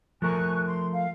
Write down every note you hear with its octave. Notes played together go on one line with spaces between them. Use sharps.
F3 A3 A#4 G#5 C#6 F#6
C6
F5